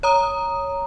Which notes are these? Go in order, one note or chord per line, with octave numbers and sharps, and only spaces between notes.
C#5 A#5 D#6